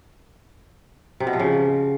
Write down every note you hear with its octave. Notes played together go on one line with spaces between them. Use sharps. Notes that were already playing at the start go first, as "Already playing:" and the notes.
C3
B2
F3
C#3